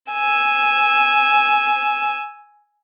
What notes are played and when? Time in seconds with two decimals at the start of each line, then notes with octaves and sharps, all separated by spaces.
0.13 G#5 E6